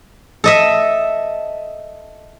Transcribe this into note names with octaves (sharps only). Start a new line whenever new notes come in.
A4 D#5 E5